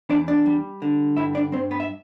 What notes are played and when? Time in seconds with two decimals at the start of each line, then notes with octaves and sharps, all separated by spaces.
0.10 E2 D4 D5
0.28 D4 D5
0.46 G3
0.82 D3
1.17 G2 E4 E5
1.35 D4 D5
1.52 G2 C4 C5
1.71 B3 B4
1.80 E5